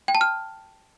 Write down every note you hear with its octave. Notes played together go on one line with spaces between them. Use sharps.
G5
A5
F6